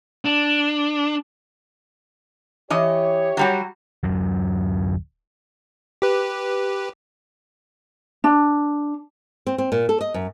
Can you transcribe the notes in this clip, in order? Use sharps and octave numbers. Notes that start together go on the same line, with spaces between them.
D4
E3 G4 C#5 D#5
F#3 G3 F#4
D1 A#1 F#2 F#3
G4 B4
D4
C4
C4
A#2
A4
D#5
F#2